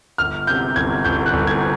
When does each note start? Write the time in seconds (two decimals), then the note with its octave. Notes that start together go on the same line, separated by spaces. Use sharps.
0.18 G1 F6
0.47 C3 G6
0.76 G1 G#6
1.04 G1 G6
1.26 F#6
1.33 G1
1.47 G#6